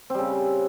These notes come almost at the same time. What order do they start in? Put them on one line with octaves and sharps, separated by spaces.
C4 G3 C#3